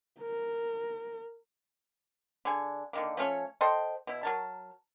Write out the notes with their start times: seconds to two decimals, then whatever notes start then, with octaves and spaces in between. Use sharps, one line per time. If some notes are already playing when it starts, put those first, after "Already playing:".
0.21 A#4
2.45 D3 G#4 G#5
2.93 D3 D#3 A#3
3.17 F3 A3 C#4 C#5
3.61 A4 C5 D#5 G5
4.07 B2 E4
4.23 F#3 A#4 A5